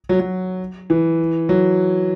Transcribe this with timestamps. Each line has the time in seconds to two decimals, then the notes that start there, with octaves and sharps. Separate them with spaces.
0.09 F#3
0.20 F#3
0.90 E3
1.49 F#3